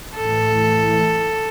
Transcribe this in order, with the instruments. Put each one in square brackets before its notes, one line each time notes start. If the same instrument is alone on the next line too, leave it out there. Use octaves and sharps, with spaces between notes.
[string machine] A2 E3 A3 [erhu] A4